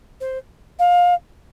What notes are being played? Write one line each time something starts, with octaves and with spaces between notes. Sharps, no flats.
C5
F5